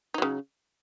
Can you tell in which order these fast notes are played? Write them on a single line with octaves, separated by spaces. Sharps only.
D#4 F#3 C#3